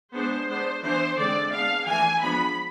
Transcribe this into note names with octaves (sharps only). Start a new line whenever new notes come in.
G#3 B3 D4 C5
G#3 B3 D4 C5
E3 B3 D4 C5
D3 G#3 C4 D5
G#3 B3 D4 F5
E3 A3 D4 G#5
F3 G#3 B3 D4 B5